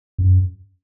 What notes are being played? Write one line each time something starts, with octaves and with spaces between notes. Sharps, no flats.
F#2